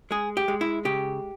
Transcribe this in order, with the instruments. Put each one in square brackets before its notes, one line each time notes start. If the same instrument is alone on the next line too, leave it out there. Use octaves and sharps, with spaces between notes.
[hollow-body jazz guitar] G#3 G#4
G4
G#3
E4
C#3 G4